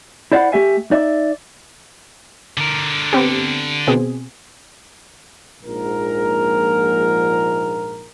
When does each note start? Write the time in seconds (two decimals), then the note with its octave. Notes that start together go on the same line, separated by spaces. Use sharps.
0.32 E4 C5 D5 F5 F#5 B5
0.52 A3 G4 E5 G#5
0.91 D#4 D5 E5
2.57 D3 A#4
3.13 B3 C4 G4
3.87 B2 C4 G#4
5.63 A#1 G#2 A#4